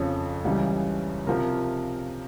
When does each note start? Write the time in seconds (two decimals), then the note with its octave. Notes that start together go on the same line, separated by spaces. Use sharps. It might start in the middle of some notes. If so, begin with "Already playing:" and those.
Already playing: F2 C#3 F3 C#5
0.44 C#2 C#3 E3 G3
1.27 C3 F3 A#4